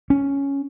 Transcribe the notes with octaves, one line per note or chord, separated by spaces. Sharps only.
C#4